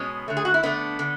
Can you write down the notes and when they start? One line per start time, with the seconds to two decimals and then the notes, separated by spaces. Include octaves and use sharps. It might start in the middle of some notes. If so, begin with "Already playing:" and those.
Already playing: B2 G#3 B3 C#4
0.28 D3 A3
0.37 G#4
0.45 F#4
0.54 E4
0.63 D3 A3 B3 D4
0.99 D3